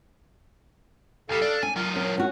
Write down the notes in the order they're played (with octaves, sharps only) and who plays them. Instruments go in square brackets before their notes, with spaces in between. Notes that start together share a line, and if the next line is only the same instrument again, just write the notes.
[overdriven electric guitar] C#2 G3 [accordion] A4 F5
[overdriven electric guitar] D4
[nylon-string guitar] D4 [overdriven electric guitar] G#5
[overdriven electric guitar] F#3 F4 [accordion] A#4
[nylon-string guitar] C#4 [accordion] A#4
[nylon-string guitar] C#4 F#4